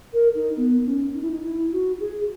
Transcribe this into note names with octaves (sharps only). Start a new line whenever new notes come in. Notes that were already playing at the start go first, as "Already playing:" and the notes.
A#4
D#4
B3
C#4
D#4
E4
D#4
E4
F#4
G#4